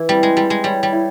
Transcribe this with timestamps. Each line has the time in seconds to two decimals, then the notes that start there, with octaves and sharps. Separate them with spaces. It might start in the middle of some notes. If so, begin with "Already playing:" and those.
Already playing: E3 E4
0.09 G3 C4
0.23 G#3
0.37 G3 A4
0.50 G#3
0.64 G3 C#5
0.83 G3
0.93 E4